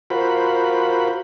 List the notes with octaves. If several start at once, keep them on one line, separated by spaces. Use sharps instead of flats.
F4 F#4 A#4 C5 B5